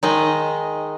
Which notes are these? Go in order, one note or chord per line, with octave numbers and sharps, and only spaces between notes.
D#3 G#3 D#5